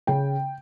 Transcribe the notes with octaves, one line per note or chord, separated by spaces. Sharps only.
C#3 G5